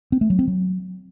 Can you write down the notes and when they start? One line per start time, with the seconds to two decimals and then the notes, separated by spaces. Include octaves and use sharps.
0.12 C4
0.21 A3
0.30 F#3
0.39 C4
0.48 F#3